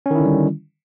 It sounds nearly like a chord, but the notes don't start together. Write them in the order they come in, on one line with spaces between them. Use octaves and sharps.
C#4 D#3 E4 D3 G3